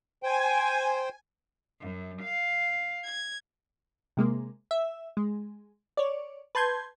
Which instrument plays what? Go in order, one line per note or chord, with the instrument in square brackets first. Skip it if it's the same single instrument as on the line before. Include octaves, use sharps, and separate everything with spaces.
[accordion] C5 G5 [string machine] G#5
[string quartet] F#2
F5
G#6
[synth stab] C3 G#3 A#3
E5
G#3
C#5 D5
B4 A5 C6 G6 G#6